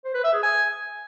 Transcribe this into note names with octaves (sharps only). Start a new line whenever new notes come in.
C5
B4
E5
G#4
G#5